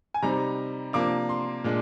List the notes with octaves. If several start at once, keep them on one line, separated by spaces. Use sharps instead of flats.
G#5
C3 G3 C4 D#4 A#5
C3 F3 A#3 D4 D6
C6
A#2 G#3 D4